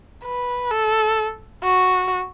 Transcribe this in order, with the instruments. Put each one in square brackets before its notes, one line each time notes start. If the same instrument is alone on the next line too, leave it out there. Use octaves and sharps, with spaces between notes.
[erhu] B4
A4
F#4